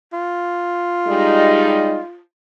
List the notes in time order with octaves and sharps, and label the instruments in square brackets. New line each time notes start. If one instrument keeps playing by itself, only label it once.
[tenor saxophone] F4
[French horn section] G3 G#3 D#4